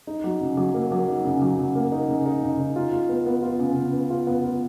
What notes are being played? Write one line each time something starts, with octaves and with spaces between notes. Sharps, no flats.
D#4
F#3
C#3
F#3
A#3
F#3
D#4
C#3
F#3
C#3
A#3
D#4
C#3
D#4
C#3
D#4
F4
F4
B3
B3
F4
C#3
C#3
B3
F4
B3
F4